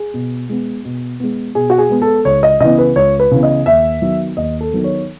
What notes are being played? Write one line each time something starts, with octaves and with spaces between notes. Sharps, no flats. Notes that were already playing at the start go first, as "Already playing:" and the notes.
Already playing: G#4
B2
G#3 B3
B2
G#3 B3
B2 G#4
F#4
G#4
G#3 B3
A4
C#2 C#5
D#5
C#3 E3 B3 D#5
B4
C#2 C#5
B4
C#3 E3 B3
D#5
D#2 E5
D#3 F#3 B3
D#2 D#5
A4
D#3 F#3 B3
C#5